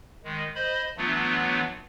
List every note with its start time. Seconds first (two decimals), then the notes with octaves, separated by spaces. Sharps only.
0.24 D#3 G#3
0.55 C5 D#5 B5
0.97 E3 F#3 A3 B3 D4 F4